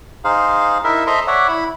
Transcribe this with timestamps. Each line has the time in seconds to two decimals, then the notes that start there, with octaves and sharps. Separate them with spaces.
0.24 D#4 G#4 C5 F5
0.84 D#4 E4 A#4 E5
1.07 A4 C5 D#5 E5 A#5 C6
1.27 C#5 D5 E5 F#5
1.48 E4 B5